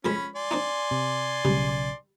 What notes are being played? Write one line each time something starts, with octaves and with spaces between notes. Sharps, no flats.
F2 G#3 C#4 C5 B5
D5 G#5 C6
C4 D4 D#4
C3
B1 C#3 G3